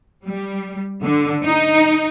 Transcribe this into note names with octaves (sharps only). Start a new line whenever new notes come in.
G3
D3
D#4